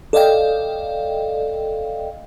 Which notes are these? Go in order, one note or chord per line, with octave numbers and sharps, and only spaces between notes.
A4 D5 D#5 F5 G5